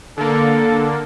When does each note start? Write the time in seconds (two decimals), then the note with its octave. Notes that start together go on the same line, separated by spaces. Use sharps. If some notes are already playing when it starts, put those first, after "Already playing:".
0.18 D3 A#3 A4